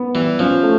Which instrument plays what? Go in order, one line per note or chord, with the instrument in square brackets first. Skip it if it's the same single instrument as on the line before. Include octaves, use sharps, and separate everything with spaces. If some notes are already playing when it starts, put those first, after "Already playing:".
Already playing: [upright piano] B3
[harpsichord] E3 [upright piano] G3
[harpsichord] F3 [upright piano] C#4
[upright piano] A3